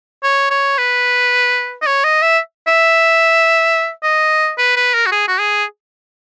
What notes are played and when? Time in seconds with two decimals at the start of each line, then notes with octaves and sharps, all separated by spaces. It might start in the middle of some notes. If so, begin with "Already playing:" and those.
0.23 C#5
0.50 C#5
0.78 B4
1.82 D#5
1.86 C#5
2.04 D#5
2.22 E5
2.68 E5
4.03 D#5
4.58 B4
4.76 B4
4.94 A#4
5.06 F#4
5.12 G#4
5.27 F#4
5.40 G#4